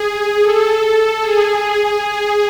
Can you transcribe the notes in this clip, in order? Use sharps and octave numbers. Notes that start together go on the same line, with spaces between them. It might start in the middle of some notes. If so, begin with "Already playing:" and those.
Already playing: G#4
A4
A4
G#4